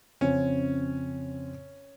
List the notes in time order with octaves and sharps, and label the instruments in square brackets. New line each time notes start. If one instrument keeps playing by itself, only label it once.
[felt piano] F2 C#3 C4 [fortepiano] C#4